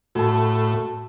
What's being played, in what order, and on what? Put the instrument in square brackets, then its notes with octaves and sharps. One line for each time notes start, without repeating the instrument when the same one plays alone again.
[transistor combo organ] A2 [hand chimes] F#4 A5